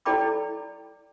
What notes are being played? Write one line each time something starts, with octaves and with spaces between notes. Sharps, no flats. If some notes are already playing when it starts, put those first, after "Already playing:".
E4 A4 D5 G5 B5 D6